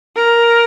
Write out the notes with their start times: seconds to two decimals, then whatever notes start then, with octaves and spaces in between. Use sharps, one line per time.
0.16 A#4